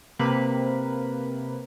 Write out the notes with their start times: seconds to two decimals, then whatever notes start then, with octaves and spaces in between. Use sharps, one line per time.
0.19 C3 A#3 B4